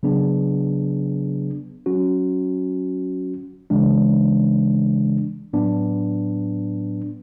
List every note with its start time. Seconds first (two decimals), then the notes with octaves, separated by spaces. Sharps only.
0.03 C#3 F#3 B3 D4 G#4
1.86 F#3 C#4 F#4
3.70 C#3 E3 G#3 D4
5.53 A2 F#3 B3 D4